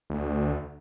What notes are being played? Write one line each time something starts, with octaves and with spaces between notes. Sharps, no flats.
D2